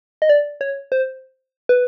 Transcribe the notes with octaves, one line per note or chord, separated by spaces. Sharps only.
D#5
D5
C#5
C5
B4